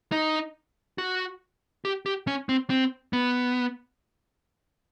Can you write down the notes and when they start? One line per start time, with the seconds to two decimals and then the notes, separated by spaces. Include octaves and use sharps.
0.12 D#4
0.98 F#4
1.85 G4
2.06 G4
2.27 C#4
2.49 C4
2.70 C4
3.13 B3